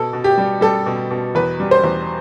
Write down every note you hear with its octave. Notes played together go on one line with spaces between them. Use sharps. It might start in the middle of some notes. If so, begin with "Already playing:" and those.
Already playing: B2 A4
B2
G4
G3
G3 A4
B2
B2
E2 B4
G3
C5
E2